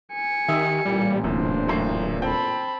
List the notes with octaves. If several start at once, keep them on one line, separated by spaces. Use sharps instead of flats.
G#5 C#7
D#3 G4 E5 D#6 E6
A1 A#2 G3
D1 F#2 C3 E3 D4 C5
F#2 A2 C7
C4 A4 G5 A5 B5